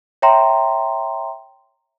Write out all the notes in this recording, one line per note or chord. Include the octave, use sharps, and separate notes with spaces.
C#5 E5 G5 A#5 C6